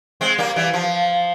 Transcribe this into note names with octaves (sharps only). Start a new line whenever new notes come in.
G#3 C4
G3 A#3
E3 G3
F3